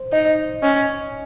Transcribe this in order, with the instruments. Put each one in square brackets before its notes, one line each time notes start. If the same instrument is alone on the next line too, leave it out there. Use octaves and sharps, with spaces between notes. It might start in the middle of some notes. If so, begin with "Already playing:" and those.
Already playing: [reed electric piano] C5
[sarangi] D#4 [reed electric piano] D#5
[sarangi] C#4 [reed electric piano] D#5